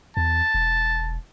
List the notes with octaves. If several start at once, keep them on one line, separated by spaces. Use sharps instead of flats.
E2 A5
E1